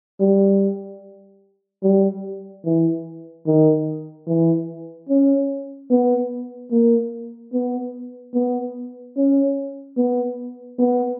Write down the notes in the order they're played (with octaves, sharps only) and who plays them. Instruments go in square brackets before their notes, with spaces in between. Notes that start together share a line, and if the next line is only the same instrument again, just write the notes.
[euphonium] G3
G3
E3
D#3
E3
C#4
B3
A#3
B3
B3
C#4
B3
B3